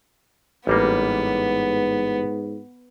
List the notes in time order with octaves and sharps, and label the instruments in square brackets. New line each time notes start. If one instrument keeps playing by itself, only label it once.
[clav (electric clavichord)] A1 G3 A#3 [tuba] G#2 [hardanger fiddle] B3